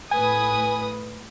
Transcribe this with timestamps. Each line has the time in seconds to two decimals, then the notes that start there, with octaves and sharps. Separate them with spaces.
0.12 A2 B4 G#5 D#6